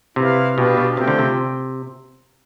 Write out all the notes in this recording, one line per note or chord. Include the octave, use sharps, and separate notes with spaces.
C3 E4 B4 F5
B2 D4 G4 B4 D5 F5
B2
C3 A3 C4 F4 C5 G5
D3
C3